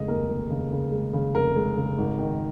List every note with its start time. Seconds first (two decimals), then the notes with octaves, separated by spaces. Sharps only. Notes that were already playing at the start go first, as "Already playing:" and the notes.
Already playing: F1 C#3 G#3 D#5
0.08 D#2 A#4
0.29 F1
0.50 C#3
0.71 C#3
0.92 G#3
1.13 C#3
1.35 F1 A#4
1.56 G#3
1.77 C#3
1.98 G#1
2.19 D#3